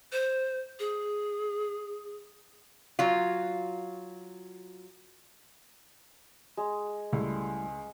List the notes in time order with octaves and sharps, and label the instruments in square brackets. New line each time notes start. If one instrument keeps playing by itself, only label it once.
[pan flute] C5
G#4
[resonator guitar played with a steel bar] F#3 F4
[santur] G#3
[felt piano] C#2 [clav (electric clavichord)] G3 A3 E4